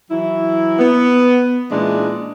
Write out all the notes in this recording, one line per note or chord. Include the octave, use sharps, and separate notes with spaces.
E3 F#3 E4
B3
A#2 E3 G#3 C#4 D4